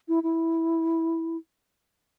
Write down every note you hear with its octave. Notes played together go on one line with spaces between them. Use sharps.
E4
E4